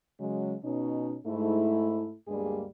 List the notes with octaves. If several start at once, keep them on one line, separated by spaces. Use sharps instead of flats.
C#3 F#3 G#3
B2 C#4 D#4
G#2 A3 E4
D2 G2 G3 G#3 A#3 G#4